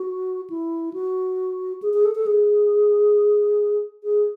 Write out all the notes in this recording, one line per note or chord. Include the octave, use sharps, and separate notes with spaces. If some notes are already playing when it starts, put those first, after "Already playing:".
Already playing: F#4
E4
F#4
G#4
G#4
A4
A4
G#4
G#4